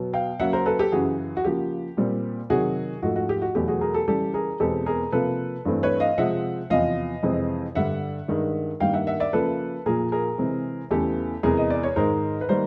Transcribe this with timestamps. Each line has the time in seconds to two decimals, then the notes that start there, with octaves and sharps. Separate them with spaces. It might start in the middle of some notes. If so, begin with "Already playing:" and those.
Already playing: B2 F#3 B3
0.13 F5 G5
0.39 C#3 F#3 A#3 E5 F#5
0.53 A#4 C5
0.66 A4 B4
0.79 G4 A4
0.92 F#2 C#3 E3 F#4 G#4
1.37 F#4
1.45 C#3 F3 A#3 G4
1.97 A#2 G3 C4
2.50 C3 D#3 F#3 F#4 G#4
3.03 G#2 F3 A3 F#4
3.16 F#4
3.29 G4
3.42 F#4
3.55 E2 B2 F#3 A3 G4
3.68 F#4 G#4
3.81 G#4 A#4
3.94 G4 A4
4.08 C#3 E3 G3 G4 A4
4.34 G#4 A#4
4.60 E2 B2 G#3 C4 G4 A4
4.86 G#4 A#4
5.12 C3 F3 A#3 A4 B4
5.65 G2 E3 A3 C4
5.83 B4 C#5
6.00 D#5 F5
6.18 C3 F3 G#3 C4 E5 F#5
6.70 E2 C3 F3 D#5 F5
7.23 F2 C3 E3 G#3 C4
7.75 G2 D3 G3 E5 F#5
8.28 G2 D#3 G#3
8.80 G2 D#3 G3 A#3 F5 G5
8.93 E5 F#5
9.07 E5 F#5
9.20 D5 E5
9.33 C#3 F3 A#3 A4 B4
9.86 A#2 F3 A#3 G#4 A#4
10.12 G#4 A#4
10.38 C3 E3 G#3 C4
10.91 E2 C#3 E3 A3 G4 A4
11.43 E2 C3 E3 G#3 G#4 A#4
11.57 D#5
11.70 D5
11.83 C#5
11.96 G#2 D#3 G#3 A#4 C5
12.41 B4
12.49 D#3 G3 A#3 A#4 C5